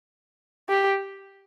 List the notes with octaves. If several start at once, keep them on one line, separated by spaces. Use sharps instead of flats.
G4